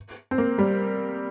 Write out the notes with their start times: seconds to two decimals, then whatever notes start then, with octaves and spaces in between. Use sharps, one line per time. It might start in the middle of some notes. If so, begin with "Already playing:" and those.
0.31 C4
0.38 A#3
0.58 G3